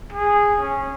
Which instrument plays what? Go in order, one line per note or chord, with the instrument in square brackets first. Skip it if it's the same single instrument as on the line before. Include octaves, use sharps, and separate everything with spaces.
[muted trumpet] G#4
C#4